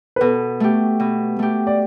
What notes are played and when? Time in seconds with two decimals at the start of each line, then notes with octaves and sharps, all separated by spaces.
0.16 B4
0.21 B2 A4
0.60 A3 G4
1.00 B2
1.39 A3 G4
1.67 D5